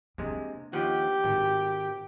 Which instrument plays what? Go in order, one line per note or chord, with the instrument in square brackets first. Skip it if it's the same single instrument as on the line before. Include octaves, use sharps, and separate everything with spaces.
[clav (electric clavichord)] C3 G#3 [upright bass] A#3 D4
[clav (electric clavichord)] D#2 F3 F#5 [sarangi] G4
[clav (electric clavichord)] G#1 [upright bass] G#2